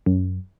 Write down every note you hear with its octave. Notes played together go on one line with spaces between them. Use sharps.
F#2